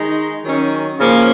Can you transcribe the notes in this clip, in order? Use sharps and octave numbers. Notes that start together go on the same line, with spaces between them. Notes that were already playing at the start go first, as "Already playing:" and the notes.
Already playing: D#3 G#3 D#4
D#3 F#3 C#4
C#3 F3 A#3 C#4